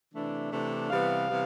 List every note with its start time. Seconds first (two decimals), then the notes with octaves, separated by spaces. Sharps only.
0.13 C3 E3 A3 D4
0.52 C3 E3 A3 D4
0.90 C3 E3 G3 B3 F5
1.30 C3 E3 G3 B3